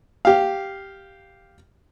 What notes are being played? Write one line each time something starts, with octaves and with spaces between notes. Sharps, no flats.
G4 F5